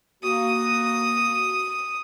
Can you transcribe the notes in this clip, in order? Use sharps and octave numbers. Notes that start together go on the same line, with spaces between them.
A#3 F#4 D#6